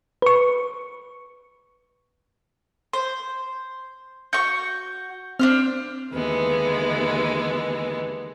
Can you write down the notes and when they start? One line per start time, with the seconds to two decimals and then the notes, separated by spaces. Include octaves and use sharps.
0.22 B4 C#6
2.93 C5 C6
4.33 F#4 C#6 G6
5.39 C4 D4 C5 F6
6.14 D#2 D3 E3 G#3 B3